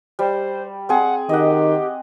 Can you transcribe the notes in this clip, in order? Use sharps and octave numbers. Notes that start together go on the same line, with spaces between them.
G3 C5
C4 G#4 F#5
D#3 G4 D#5 F#5